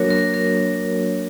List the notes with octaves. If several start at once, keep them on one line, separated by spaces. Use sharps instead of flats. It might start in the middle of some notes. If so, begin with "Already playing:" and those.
Already playing: F#3 A#3 D4 F#4 A#4 C#5
A#4
A#4